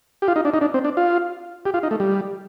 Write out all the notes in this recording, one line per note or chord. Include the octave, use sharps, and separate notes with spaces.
G4
F4
D#4
D4
D#4
D4
C4
D4
F4
G4
F4
D#4
A3
G3